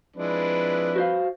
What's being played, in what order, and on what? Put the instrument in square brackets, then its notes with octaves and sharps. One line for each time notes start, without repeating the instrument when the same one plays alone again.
[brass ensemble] F3 C4 B4 [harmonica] G#3 D4 E4
[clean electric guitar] F#4 C5 F5